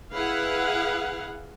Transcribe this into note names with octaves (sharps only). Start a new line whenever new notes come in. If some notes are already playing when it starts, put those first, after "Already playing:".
E4 G#4 B4 F5 F#5